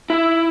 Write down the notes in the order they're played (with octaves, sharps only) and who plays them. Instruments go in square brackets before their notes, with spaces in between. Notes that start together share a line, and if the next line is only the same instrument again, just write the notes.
[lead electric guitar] E4